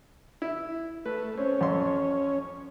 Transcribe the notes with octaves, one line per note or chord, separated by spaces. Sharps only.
E4
A3 B4
C4 C#4
F2 C6